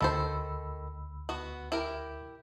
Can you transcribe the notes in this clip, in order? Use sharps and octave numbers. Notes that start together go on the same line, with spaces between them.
D2 D#3 A4 C5 B5 E6
B3 F#4
E4 G4 A#4